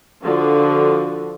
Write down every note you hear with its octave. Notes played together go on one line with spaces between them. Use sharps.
D3 F3 F#4